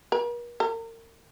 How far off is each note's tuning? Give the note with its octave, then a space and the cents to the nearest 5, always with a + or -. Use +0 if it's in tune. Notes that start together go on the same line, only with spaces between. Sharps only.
A#4 +45
A#4 -35